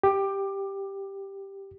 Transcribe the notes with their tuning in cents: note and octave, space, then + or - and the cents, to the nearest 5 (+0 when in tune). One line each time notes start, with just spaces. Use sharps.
G4 +0 D6 +20